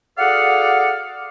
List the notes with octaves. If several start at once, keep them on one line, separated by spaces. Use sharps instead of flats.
F#4 G#4 A4 D5 F5 F#5